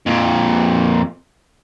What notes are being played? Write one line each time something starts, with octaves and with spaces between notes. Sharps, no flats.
F2 A#2